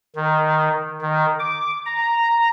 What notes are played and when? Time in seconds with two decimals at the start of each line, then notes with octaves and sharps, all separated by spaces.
0.15 D#3
1.01 D#3
1.39 D6
1.86 A#5